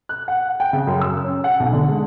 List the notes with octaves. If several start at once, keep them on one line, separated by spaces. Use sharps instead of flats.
F#6
F#5
G5
C#3
F#2
E6
C#4
F#5
B1
D3
G#3